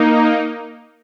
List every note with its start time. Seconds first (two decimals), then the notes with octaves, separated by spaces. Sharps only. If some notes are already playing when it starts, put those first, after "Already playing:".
Already playing: A#3 D#4